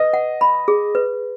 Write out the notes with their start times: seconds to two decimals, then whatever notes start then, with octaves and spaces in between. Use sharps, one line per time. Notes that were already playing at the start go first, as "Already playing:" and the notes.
Already playing: B4 D#5
0.13 F#5
0.41 B5
0.68 G#4
0.95 B4